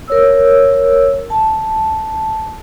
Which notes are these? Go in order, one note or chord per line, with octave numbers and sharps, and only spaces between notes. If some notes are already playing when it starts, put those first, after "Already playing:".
A#4 C#5 E6
A5